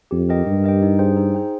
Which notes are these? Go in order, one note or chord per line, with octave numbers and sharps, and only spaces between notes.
F2 G4
A#4 D#5 G5
G2 G4
A#4 D#5 G5
D#4
G#4 C5 G5
D#4
G#4 C5 G5